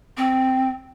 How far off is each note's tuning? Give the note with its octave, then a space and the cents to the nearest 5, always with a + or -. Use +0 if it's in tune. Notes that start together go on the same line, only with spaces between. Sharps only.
C4 -5